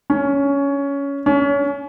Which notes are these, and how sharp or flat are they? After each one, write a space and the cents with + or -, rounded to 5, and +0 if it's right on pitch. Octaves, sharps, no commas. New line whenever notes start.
C#4 +15
C#4 +30